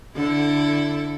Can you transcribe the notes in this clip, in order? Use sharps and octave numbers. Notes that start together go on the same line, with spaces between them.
D3 E4 A4